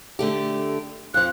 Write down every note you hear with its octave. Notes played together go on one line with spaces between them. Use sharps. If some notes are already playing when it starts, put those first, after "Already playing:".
D3 A3 G4
F2 F3 F#6